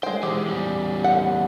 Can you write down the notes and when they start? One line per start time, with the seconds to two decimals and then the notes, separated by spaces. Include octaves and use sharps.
0.03 G#3 C5 G5
0.23 E3 G#3 G4
0.46 E2 G3
1.04 F#5